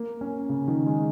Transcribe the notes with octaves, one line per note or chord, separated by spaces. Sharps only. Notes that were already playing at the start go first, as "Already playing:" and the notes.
Already playing: A#3
C#4
C#3
D#3
G#3